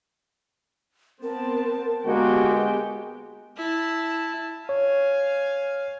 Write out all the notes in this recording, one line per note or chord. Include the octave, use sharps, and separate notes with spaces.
B3 C4 A#4 A5
D3 G#3 A#3 B3 F#4 G4 G5
E4 A5
C#5 F5 G#5